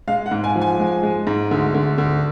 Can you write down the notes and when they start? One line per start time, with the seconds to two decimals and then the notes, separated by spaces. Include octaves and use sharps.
0.07 G#3 F5
0.26 F#5
0.31 G#2
0.44 G#5
0.56 F3
0.62 G#5
0.79 G#3
1.03 G#3
1.27 G#2
1.51 D2
1.74 D2
1.98 D2